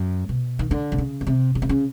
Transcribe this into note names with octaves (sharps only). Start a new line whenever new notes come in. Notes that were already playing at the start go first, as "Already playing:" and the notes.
Already playing: F#2
B2
D#3
D3
C3
C#3
B2
C3
C#3
C3
C#3